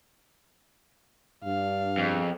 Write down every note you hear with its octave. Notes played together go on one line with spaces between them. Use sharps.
G2 D4 F5
F2 B2 G#4